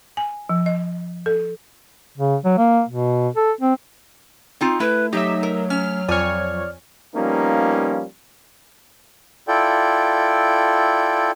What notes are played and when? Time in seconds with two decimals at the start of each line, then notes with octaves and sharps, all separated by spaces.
0.17 G#5
0.49 F3
0.66 D#5
1.26 A4
2.18 C#3
2.45 F#3
2.58 A#3
2.88 B2
3.36 A4
3.61 C4
4.61 C4 D#4 F4
4.80 A3 E4 B4
5.13 F#3 D#4 G4 E5
5.43 A#4
5.70 C#4 F6
6.09 F2 C#5 D5 G#5 F6
7.15 F3 G3 A#3 B3 C#4 D#4
9.48 E4 F4 A4 D5 G5